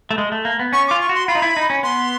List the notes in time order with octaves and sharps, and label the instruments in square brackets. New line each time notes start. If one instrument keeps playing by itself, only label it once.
[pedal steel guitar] A3
G#3
A3
A#3
B3
[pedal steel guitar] C#4 [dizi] C#6
[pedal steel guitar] F4 [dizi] D6
[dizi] C#6
[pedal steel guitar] F#4
[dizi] C6
[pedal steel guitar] F4 [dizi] B5
[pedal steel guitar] D#4
E4
D#4
C#4
[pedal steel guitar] B3 [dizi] C6